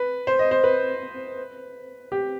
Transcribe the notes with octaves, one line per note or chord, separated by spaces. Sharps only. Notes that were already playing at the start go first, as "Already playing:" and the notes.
Already playing: B4
C5
D#5
C5
B4
G4